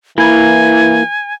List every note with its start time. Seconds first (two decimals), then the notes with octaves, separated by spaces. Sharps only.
0.18 E3 A#3 E4 G#5